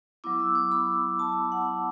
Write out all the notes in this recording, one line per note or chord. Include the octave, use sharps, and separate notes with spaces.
F#3 B3 E4 D6
E6
D6
B5
A5
F#5